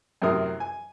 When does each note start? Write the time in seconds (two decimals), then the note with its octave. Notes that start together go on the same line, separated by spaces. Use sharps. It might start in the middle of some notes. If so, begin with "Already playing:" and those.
0.22 F#2 A2 C3 A#4 D#6
0.60 G#5